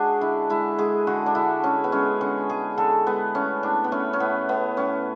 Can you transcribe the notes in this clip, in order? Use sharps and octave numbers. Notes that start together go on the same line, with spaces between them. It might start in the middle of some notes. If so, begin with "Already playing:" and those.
Already playing: G#3 D4 F#4 G#4
D3 E4
G#3 E4
G#3 G#4
D3 F#4
D4
D3 E4
G#3 C#4
B3
G#3 C#4
D3 C#4
G#3 G#4
D3 A4
G#3 B3
A3 C#4
A2 D4
B3
A3 C#4
C#4
A2 B3
A2 B3
A2 C#4